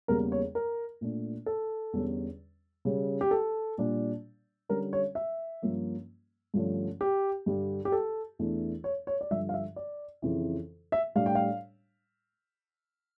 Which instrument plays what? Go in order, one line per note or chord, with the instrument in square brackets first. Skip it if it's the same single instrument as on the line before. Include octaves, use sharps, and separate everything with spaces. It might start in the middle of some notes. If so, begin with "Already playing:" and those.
[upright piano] E2 C#3 G3 A#3 A#4
C#5
A#4
A#2 A3 D4
A4
E2 D3 G3 C#4
C#3 G3 C#4
G4
A4
A#2 G3 D4
D3 G3 C#4 A#4
C#5
E5
G2 F3 A#3 C#4
G2 D3 F3 A3 C#4
G4
G2 D3 G3 D4
G4
A4
E2 E3 A3 D4
C#5
C#5
D5
G2 D3 F3 E5
F5
E5
D5
F2 C#3 E3
E5
A2 G3 D4 F5
G5
F5